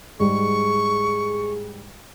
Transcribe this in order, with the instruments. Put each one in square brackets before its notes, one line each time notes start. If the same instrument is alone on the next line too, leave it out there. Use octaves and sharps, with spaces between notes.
[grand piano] G#2 G3 [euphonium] G#4 [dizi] C#6